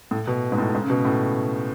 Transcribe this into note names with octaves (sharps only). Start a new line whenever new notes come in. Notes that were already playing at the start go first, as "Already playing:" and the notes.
A2
B2
G#2
A2
G#2
C#3
B2
A2